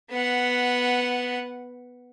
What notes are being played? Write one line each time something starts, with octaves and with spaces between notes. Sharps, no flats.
B3 F#5